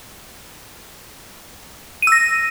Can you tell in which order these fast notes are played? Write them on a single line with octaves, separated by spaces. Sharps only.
D#7 E6 A#6